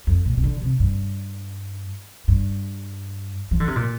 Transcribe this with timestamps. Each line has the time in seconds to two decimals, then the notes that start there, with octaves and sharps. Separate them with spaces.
0.07 F2
0.25 A#2
0.37 C3
0.43 D3
0.62 C3
0.80 G2
2.28 G2
3.51 F3
3.60 D3
3.67 C3
3.76 A#2